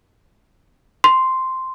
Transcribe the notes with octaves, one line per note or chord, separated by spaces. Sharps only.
C6